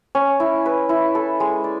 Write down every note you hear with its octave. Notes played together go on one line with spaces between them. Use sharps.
C#4
E4
B4
E4
A4
G#3
D5